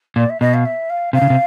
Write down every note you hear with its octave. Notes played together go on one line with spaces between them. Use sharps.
A#2 D5
E5
B2 D#5
F5
E5
F5
C3 F5
C#3
C3